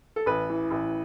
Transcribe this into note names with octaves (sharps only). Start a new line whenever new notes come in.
A4
A1 B4
E3
A1